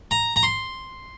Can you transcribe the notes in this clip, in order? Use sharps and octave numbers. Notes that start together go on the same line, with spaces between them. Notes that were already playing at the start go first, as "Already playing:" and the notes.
A#5
A#5
C6